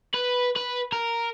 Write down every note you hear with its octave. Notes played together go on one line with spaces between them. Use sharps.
B4
B4
A#4